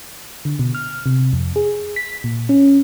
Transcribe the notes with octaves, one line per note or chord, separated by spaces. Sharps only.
D3
B2
F6
C3
F2
G#4
B6
A#2
C#4